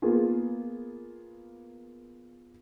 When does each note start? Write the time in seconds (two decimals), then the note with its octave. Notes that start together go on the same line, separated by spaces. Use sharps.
0.02 A#3 B3 F4 G#4